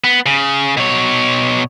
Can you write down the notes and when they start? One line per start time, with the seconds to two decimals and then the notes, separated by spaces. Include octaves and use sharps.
0.04 B3
0.26 C#3
0.77 B2 C#5